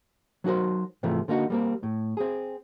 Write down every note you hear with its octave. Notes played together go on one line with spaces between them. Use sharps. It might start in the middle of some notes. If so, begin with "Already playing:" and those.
F#3 D#4 F#4 A#4 C5
G#2 C3 E3 F3 A3
D3 A#3 D#4 F#4
G3 A#3 C4
A2
C4 G#4